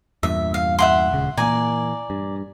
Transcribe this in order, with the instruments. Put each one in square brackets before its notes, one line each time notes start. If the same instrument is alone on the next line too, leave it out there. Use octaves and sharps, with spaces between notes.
[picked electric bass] E2 G2 A#2 [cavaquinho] E5
[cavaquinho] F5
E5 F#5 C6
[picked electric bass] D#1 C#2 C#3
[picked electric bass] A#2 E3 A#3 [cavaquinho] A#4 D5 G#5
[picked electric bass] G2